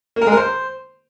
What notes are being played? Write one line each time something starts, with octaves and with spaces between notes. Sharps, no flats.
A#3
A#4
G#3
A#4
C5